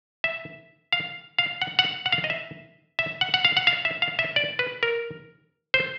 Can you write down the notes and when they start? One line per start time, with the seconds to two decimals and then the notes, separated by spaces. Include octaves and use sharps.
0.24 E5
0.92 F5
1.39 F5
1.62 F#5
1.79 F#5
2.06 F#5
2.12 F5
2.24 D#5
2.30 E5
2.99 E5
3.21 F#5
3.34 F#5
3.45 F5
3.57 F#5
3.67 F5
3.85 E5
4.02 F5
4.19 E5
4.36 D5
4.59 B4
4.83 A#4
5.74 C5